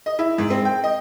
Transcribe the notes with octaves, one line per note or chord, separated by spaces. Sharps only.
D#5
E4
G#2
C4
G5
D#5